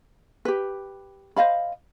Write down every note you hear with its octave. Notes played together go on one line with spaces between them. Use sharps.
G4 B4
C5 D#5 F5 B5